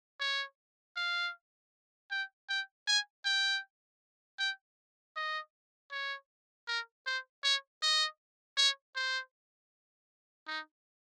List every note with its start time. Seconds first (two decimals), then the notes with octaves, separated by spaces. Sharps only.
0.21 C#5
0.97 F5
2.11 G5
2.49 G5
2.87 G#5
3.25 G5
4.39 G5
5.16 D#5
5.92 C#5
6.68 A#4
7.06 C5
7.44 C#5
7.82 D#5
8.57 C#5
8.96 C5
10.48 D#4